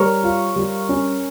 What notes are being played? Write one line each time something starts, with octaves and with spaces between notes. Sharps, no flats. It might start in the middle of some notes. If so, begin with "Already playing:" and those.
Already playing: G3 A#4 C#5
F4
G3
C#4